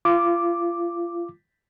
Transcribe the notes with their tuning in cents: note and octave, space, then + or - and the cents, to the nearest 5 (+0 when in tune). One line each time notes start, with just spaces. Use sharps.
F4 -30 D6 +0